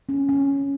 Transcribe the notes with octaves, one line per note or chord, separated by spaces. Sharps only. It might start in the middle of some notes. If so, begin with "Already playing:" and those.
C#4
C#4